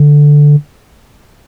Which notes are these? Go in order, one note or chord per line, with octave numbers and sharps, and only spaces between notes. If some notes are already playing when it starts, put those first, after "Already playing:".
Already playing: D3